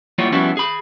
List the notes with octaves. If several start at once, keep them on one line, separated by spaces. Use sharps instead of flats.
F#3 G3 A#3 E4 F4 C#5
F3 G3 B3 C#4 E4 F#4
G#4 B5